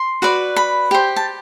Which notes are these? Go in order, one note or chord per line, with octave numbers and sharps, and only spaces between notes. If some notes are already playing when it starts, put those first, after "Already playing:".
Already playing: C6
F#4 B4 D5
B5
G4 C5
A5